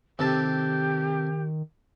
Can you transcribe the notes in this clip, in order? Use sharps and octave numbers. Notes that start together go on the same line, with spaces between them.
C3 D#3 G4 A4 A5